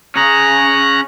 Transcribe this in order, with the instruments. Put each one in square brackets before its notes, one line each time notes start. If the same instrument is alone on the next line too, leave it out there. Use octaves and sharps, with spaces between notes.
[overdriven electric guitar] C#4 G#4 [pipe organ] A#5 F#6